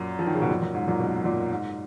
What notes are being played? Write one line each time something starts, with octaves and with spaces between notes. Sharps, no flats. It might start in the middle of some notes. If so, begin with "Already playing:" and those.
Already playing: F#2 A#2
F3
D#3
C#3
B2
F#2 A#2
F#2
G#2
F#2 A#2
G#2 B2
F#2 A#2
G#2